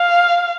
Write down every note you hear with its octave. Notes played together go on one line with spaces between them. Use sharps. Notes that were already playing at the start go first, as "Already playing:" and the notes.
Already playing: F5